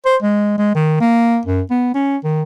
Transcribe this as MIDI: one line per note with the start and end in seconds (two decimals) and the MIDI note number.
0.06 0.16 72
0.22 0.54 56
0.58 0.72 56
0.75 0.99 51
1.00 1.39 58
1.46 1.61 42
1.70 1.91 59
1.95 2.17 61
2.24 2.43 51